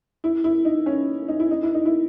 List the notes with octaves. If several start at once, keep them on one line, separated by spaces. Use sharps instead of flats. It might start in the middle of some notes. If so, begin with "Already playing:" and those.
E4
E4
D#4
C#4
D#4
E4
D#4
E4
D#4
E4